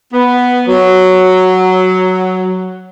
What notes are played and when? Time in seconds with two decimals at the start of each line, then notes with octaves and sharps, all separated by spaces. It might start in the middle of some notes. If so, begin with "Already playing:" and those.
0.13 B3
0.67 F#3